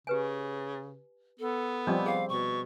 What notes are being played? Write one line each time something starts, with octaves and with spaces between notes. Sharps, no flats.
C#3 G4 B4 G#5
B3 A4
F3 G3 C4 D4 D#5
G#4 F5
B2 C#6